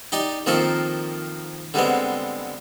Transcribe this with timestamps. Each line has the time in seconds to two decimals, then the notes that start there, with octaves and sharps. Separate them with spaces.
0.12 D#4 G4 D5
0.46 D#3 F3 A#3 C4 A4
1.74 D3 G3 G#3 B3 C4